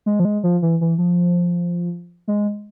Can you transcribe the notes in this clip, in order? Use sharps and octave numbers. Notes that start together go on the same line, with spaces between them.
G#3
F3
G#3
F3
E3
E3
F3
G#3